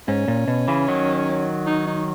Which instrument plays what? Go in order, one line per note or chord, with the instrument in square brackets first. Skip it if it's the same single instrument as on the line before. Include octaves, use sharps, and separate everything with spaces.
[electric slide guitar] G#2 [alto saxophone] C#4
[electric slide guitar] A#2
B2
C#3 E3
D#3 F#3
[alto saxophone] D#4
D#4